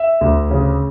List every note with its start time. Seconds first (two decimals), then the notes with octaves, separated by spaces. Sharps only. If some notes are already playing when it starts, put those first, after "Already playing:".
Already playing: E5
0.21 D2
0.50 C#3